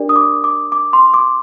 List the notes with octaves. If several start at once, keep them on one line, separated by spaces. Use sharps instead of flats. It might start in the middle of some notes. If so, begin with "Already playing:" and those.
Already playing: D4 G4 A#4 D5
D#6
D6
D6
D6
C6
D6